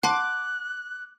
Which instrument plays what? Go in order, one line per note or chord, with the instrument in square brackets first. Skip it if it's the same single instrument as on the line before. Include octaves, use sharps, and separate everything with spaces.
[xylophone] F#5 A5 C6 [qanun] D6 [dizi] F#6